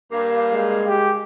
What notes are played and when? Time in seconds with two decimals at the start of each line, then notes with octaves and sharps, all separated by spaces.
0.12 G2 A#3 F5
0.52 G#3
0.87 G4